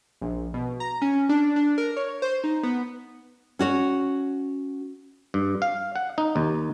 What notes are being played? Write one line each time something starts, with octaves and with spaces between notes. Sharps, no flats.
A#1
B2
A#5
C#4
D4
D4
A#4
C#5
C5
D#4
B3
C#4 F#4 C#5
G2
F5
F#5
D#4
D#2